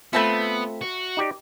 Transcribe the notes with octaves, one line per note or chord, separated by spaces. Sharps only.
A3 B3 C4 F4 E5 A5 B5
F#4
D#4 G4 D5